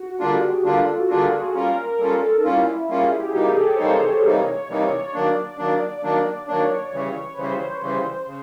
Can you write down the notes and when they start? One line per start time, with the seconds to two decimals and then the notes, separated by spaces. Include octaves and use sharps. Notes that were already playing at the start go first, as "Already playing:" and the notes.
Already playing: F#4
0.20 D3 G3 A#3 D4 F4 G#4
0.31 G4
0.43 G#4
0.64 D3 G3 A#3 D4 F4 A4
0.76 A4
0.87 F4
0.98 F#4
1.10 D3 G3 A#3 D4 F4 G#4
1.54 G3 A#3 C#4 F4 A#4
1.89 A#4
1.99 G3 A#3 C#4 F4 A4
2.37 D#4
2.44 G3 A#3 C#4 E4 F4
2.89 G3 A#3 C#4 F4 G#4
3.11 G4
3.23 F#4
3.34 C3 E3 G3 A#3 D#4 G4
3.45 G#4
3.56 A4
3.68 C#5
3.75 C5
3.78 C3 E3 G3 A#3 D#4 C#5
4.23 C3 E3 G3 A#3 D#4
4.68 C3 E3 G3 A#3 D#4 D5
5.14 D#3 F#3 A#3 D4 D5
5.58 D#3 F#3 A#3 D4
6.03 D#3 F#3 A#3 D4
6.48 D#3 F#3 A#3 D4 C#5
6.93 C#3 E3 G3
7.34 B4
7.38 C#3 E3 G3 C5
7.82 C#3 E3 G3 C5
8.27 C#3